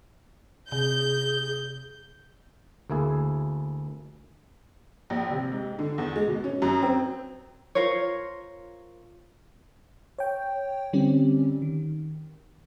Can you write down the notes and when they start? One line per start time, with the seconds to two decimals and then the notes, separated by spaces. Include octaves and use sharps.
0.72 C3 G#4 G6
2.90 D2 A#3 E4 G#4
5.10 A#1
5.31 C3
5.52 G#2
5.79 D3
5.98 E2
6.16 G#3
6.28 B2
6.44 C#4
6.62 F#2
6.83 C4
7.75 F4 A#4 C5 C#5
10.18 C#5 G5
10.93 D3 G3 C4 C#4 G4
11.62 D#3